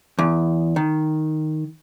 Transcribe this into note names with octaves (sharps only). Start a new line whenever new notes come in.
E2
D#3